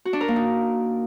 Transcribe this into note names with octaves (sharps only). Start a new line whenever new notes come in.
F#4
D4
A#4
A#3
D#4